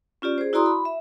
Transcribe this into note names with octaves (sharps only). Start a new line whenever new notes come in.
C#4 F4 G4 D5
G#4 C5
E4 F#4 D5 A#5 C6 D#6
B5
E5